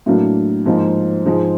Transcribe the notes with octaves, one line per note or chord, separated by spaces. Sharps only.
A2 F#3 A#3 D4
G#2 F3 A#3
G#2 F3 G#3